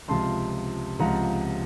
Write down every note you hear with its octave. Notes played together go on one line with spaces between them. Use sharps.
C#2 C3 F3 A5 C6
C#2 C3 F3 F#5 A#5